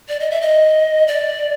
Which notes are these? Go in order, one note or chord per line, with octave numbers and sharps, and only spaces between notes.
D5
D#5
E5
D#5
D5